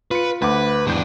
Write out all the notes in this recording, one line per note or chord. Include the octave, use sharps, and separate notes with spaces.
F4 B4 C#7
D2 B4 F#5 D6
E2 G#2 D4 G6